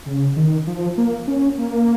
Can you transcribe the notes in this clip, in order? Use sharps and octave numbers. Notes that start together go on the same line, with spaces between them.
C#3
D#3
F3
A#3
C#4
A#3